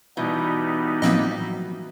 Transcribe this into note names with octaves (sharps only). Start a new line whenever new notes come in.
B2 E3 G3 B3 D#4
A2 F3 F#3 A#3 C4 D#5